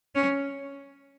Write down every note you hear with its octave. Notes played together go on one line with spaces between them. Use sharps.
C#4